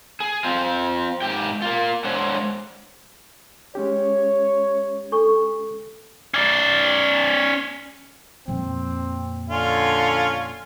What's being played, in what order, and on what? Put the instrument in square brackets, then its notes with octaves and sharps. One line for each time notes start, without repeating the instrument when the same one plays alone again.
[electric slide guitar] G#4
C4 F4 C5
G#2 G4 G5
A#3 F4
G#3 D4 C5 C#5 F#5
[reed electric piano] G#3 C#4 G4 [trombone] C#5
[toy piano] D4 A4 C#6
[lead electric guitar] C#4 D5
[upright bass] F2 A#2 [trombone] C4
[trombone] D3 [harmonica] C#4 F4